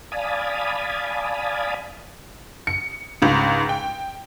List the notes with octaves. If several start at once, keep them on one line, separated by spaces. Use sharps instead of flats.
D5 F5 G#5 A5 B5 D#6
C#7
C#2 G#2
G5